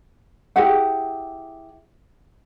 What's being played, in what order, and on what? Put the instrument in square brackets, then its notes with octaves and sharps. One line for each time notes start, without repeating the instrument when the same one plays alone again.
[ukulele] E4 G4 G#4 F#5